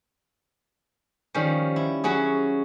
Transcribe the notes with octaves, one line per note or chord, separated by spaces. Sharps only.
D#3 F3 G3 C#4
E4
F#3 C#4 F#4 G#4